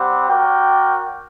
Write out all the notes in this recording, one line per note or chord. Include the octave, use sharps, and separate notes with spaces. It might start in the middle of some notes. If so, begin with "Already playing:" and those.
Already playing: G3 C4 G4 F#5
F#4 A#4 D5 G5